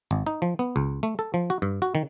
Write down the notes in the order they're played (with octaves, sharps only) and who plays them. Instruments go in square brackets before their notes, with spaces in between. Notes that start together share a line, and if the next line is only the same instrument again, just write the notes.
[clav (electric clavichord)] G#1
D#4
F3
B3
C#2
A3
A4
F3
F#4
G2
F#4
D#3